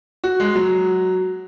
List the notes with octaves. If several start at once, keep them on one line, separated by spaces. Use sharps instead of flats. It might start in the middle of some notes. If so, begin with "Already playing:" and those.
F#4
G#3
F#3